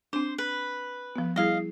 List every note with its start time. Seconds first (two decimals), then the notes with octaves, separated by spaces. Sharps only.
0.13 C4 D4 C5
0.38 B4
1.16 F3 B3
1.36 G3 E4 G#4 D#5 F5